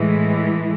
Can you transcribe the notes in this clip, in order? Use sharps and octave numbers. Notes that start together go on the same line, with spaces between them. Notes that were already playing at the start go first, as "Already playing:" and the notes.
Already playing: A2 E3 G#3